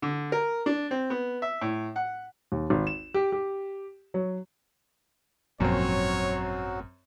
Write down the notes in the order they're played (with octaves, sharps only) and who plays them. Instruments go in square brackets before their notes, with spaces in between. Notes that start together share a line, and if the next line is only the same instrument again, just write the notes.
[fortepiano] D3
A#4
D4
C4
B3
E5
A2
F#5
[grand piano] D#2
G#1
E7
G4
G4
F#3
[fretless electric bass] G#1 A#2 F3 [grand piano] F#2 C4 [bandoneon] F#3 F#4 [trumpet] C#5